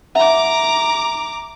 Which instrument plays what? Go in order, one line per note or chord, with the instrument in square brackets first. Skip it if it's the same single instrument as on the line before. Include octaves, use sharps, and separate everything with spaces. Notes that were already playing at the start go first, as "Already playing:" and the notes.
[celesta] E5 F#5 [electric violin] A#5 D6